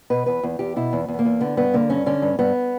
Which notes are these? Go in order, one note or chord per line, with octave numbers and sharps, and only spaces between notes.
B2 B4
E2 B4
E2
E2 G4
B2 E4
E2
E2
B3
A#3
E2
D3 B3
G2 B3
D3 A#3
G2 C#4
D3 C#4
G2
G2 B3